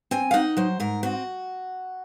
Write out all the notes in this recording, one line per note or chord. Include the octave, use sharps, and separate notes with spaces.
C4 G#5
F5
D#4 F#5
F#3 C5
G#2 A#4
C4 F#4